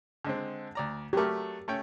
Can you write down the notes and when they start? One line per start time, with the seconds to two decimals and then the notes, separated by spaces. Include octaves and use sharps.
0.25 D3 G#3 C4
0.75 D2 D5 A#5
1.13 F#3 A3 G4 A#4
1.68 A3 C#4 G5